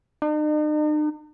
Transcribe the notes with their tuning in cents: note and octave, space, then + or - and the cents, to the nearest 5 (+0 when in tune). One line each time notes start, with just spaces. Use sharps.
D#4 -45